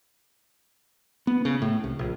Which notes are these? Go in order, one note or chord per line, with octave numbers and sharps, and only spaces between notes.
B3
C#3
A2
C2
A#1